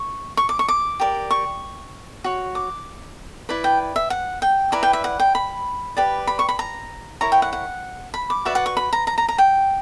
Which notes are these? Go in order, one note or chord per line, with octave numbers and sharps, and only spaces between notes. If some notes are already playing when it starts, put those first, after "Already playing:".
Already playing: C#6
C#6
D6
C#6
D6
G4 A#4 D5
C#6
F#4 C#5
D6
E4 B4 D5
G5
E5
F#5
G5
E4 B4 D5 A#5
G5
E5
F#5
G5
B5
G4 B4 D5
B5
C#6
B5
A#5
E4 A#4 C#5 A#5
G5
F#5
F#5
B5
D6
F#4 B4 D5 E5
F#5
C#6
B5
A#5
A#5
A#5
A#5
G5